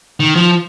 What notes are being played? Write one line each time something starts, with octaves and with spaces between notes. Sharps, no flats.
D#3
F3